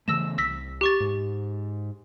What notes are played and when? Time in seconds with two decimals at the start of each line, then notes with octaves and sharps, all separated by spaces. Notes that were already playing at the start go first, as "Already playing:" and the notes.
0.08 C#3 E3 A3 E6 A#6 E7
0.38 C2 E6 A#6 B6
0.81 G4 C#6 A6
1.00 G#2